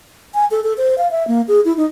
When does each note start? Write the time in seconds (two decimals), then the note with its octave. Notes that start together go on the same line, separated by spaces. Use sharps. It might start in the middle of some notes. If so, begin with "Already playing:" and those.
0.34 G#5
0.51 A4
0.64 A4
0.78 C5
0.98 F5
1.11 E5
1.28 A#3
1.48 G#4
1.65 E4
1.77 D#4